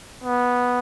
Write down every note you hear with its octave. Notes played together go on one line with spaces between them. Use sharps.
B3